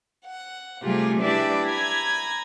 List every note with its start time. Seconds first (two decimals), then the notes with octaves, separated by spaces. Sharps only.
0.25 F#5
0.81 C3 G3 A3 F4 G4 G#4
1.19 D4 E4 G4 B4 D5 E5
1.66 G#5 A#5 B5 G#6